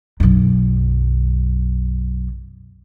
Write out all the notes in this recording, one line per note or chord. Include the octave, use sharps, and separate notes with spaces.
B1 F#2